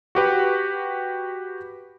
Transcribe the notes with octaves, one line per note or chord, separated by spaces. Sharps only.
F#4 G4 B4